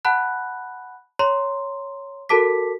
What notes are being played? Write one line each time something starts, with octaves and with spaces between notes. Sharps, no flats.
F#5 A5 B5 F#6
C#5 A#5 C6
F#4 A4 A#4 A5 D6 B6